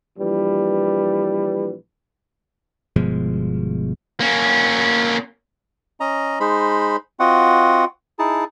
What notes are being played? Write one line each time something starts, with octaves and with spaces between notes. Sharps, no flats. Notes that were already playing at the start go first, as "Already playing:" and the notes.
A#1 E3 G3 B4
G1 B2 F3 G#3
A#3 C#4
C#4 D#5 A#5
G#3 D#4 C5 B5
C4 F4 F#4 D#5 F#5
D#4 E4 G#4 A5